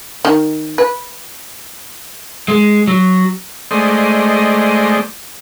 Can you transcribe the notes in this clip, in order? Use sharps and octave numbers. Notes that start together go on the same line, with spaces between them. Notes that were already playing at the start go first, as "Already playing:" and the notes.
D#3
B4
G#3
F#3
G#3 A3 C5 D5 D#5